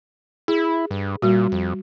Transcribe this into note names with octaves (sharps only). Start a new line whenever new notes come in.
E4 G#4
G2
A#2 G3 F#4
F2